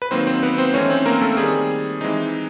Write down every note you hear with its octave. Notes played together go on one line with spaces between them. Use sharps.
B4
D#3 F#3 A#3 C4 D#4 C5
C4 C5
B3 B4
C4 C5
E3 A3 C4 C#4 D#4 C#5
C4 C5
A#3 A#4
A3 A4
D#3 G3 C4 G#4
E3 G#3 C4 D#4